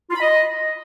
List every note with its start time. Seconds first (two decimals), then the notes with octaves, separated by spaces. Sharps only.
0.10 F4
0.16 B5
0.21 D#5